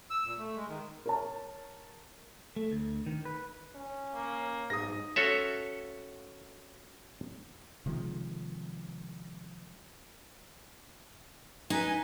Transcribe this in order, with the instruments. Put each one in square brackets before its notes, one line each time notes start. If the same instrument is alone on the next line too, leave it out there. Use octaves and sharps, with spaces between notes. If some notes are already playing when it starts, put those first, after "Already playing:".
[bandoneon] E6
A#2
A3
G#3
D#3
[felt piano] A#4 C#5 A5
[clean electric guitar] A3
D2
D#3
B4
[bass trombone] C#4
[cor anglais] A#3
[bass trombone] B1 [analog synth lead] G#2 [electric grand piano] D#6 A#6
[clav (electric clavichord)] C#4 F#4 A4 C#5 E5
[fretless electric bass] C3 D#3 F3 G#3
[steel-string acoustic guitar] D#4 [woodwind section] B4 G#5